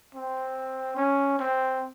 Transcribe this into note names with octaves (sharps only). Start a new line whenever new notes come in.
C4
C#4
C4